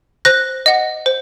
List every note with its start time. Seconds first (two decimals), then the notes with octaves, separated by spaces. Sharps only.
0.25 C5 F#6 A#6
0.66 D#5 F#5
1.06 C5